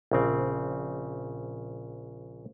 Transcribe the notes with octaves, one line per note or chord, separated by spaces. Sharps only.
A#1 C#3 C4